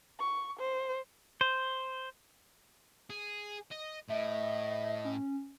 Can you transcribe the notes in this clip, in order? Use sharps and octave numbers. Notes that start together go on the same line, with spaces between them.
C#6
C5
C5
G#4
D#5
A2 D#5 E5
C#4